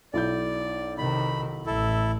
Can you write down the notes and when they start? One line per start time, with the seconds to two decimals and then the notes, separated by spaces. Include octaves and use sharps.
0.14 B1 E4 D5 G6
0.98 C3 D#3 B5
1.66 A1 E4 A4